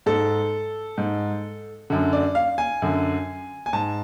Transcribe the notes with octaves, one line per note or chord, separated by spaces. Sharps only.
G#2 A4
G#2
F#2 D3
D5
F5
G#5
F#2 D3
G#5
G#2 A5